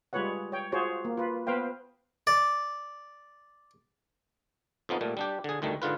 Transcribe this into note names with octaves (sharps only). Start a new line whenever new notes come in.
G3 G#3 F4 B4 C#5 F#5
C#5 G5
F4 F#4 G#4 C5 C#5
A#3
F4 B4
B3 B4 C5 F5 G5
D5
F2 F3 B3 D#4
A#2 G3 A3
G3 D4 G4
D3 G#4
D2 D#3 G3 A3
G#2 D3 F4 B4